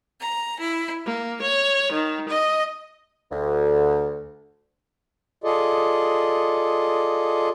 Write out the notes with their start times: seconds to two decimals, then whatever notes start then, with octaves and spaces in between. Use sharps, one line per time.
0.20 A#5
0.58 E4
1.05 A#3
1.41 C#5
1.92 D#3
2.29 D#5
3.31 D2
5.44 F4 G#4 A4 D5 D#5